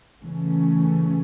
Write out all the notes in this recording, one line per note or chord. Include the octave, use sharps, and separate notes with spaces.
C#3 E3 A3 C#4